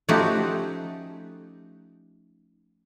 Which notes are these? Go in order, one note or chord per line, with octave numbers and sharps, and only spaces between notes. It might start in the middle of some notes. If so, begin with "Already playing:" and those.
F3 A3 C#4 D#4 F#4 G4